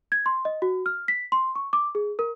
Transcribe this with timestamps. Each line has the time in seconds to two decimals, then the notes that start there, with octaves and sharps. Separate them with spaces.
0.12 G#6
0.26 C6
0.45 D#5
0.62 F#4
0.86 F6
1.08 B6
1.32 C6
1.56 C#6
1.73 D6
1.95 G#4
2.19 A#4